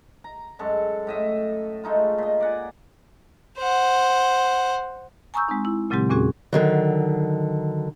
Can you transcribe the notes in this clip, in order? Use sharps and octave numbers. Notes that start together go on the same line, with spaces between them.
A#5
F#2 G#3 A4 C#6
A2 D#5 E5
G#3 A3 D#4 F4
A#2 D#5
D5 F#5 G#5
C5 F#5
G#5 A#5 C#6 D#6 E6 G6
G#3 C4 D#4
E4
A#2 C#3 F#3 G#3 C4 G4
E2 A#2 C4 C#4 F#4 G#4
D3 D#3 F#3